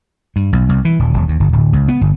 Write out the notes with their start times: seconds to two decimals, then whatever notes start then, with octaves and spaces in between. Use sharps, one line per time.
0.36 G2
0.53 B1
0.69 C2
0.85 E3
0.99 D#1
1.14 D#1
1.28 D#2
1.40 G1
1.53 D1
1.73 C#2
1.88 B3
2.01 G1